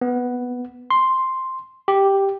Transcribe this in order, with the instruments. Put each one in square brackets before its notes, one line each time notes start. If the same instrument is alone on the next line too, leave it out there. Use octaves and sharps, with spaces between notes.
[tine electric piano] B3
C6
G4